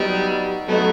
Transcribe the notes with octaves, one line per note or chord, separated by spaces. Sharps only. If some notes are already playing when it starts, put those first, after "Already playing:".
Already playing: F#3 G3 B3 D#4
F#3 A3 B3 D#4